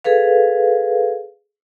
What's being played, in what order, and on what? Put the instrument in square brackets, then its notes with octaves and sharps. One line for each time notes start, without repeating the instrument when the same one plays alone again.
[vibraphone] G#4 A4 B4 F5